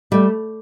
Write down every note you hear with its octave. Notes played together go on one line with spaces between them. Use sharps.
G3 A3